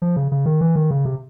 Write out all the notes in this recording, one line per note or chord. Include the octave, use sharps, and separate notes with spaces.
F3
C#3
C#3
D#3
E3
D#3
C#3
C3